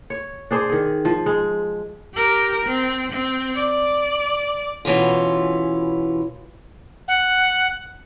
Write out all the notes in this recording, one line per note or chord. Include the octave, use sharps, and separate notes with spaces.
C#5
D4 G#4 C5
D#3 G#4
F3
G#3
G4 A#4
C4
C4
D5
B2 E3 C#4 F4
F#5